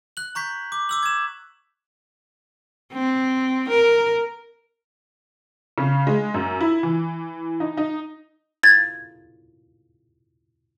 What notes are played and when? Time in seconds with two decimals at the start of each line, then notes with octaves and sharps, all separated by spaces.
0.17 F#6 F#7
0.35 A#5 C#6 G6 B6
0.72 D6
0.89 D6 E6 F#7
1.03 G#6 E7
2.93 C4
3.69 A#4
5.78 C#3
6.07 G#3
6.34 F#2
6.61 E4
6.83 E3
7.60 D#4
7.77 D#4
8.63 G#6 A6